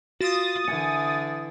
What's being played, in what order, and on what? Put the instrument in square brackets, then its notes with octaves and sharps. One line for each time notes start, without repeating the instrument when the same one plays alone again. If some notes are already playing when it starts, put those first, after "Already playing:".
[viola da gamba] F4 [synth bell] F#4 [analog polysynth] D#6 A6
[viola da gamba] D3 [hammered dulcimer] E3 G#5 [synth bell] C#7